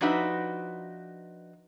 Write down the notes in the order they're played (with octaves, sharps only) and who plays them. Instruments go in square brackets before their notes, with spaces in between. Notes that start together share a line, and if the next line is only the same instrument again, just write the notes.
[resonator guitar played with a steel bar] F3 D4 D#4 F#4 B4 E5